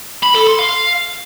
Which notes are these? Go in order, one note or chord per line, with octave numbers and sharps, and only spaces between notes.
B5
A4
C6
F5